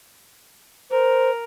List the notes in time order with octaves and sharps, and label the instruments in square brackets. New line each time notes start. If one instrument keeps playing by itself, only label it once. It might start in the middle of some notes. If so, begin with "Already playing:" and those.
[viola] A#4 [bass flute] C5